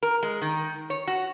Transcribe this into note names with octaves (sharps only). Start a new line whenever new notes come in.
A#4
G#3
D#3
C#5
F#4